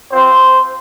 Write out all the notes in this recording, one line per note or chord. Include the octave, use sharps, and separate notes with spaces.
C4 F4 C5